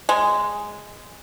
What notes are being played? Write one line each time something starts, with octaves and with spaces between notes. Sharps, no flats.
G#3